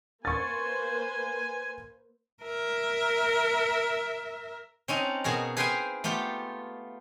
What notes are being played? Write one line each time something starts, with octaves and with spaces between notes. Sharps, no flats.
A#3 B4 C5 G#5 C#6 A6
A#4 E5
C4 C#4 D#4 A5
B2 F#4 G#4 A#4
G#4 B4 C5 F5 G5 G#5
A3 B3 F4 G4